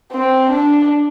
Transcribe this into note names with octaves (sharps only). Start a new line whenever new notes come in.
C4
D4